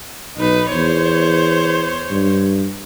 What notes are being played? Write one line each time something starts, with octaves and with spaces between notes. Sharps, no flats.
B1 D#4 B4
E2 C5 C#5
G2